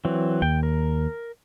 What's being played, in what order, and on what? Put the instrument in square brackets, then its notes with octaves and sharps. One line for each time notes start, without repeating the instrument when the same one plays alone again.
[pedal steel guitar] E3 F#3 C4
[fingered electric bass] D#2 [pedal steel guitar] G5
[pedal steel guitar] A#4